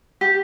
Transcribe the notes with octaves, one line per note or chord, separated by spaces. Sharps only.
G4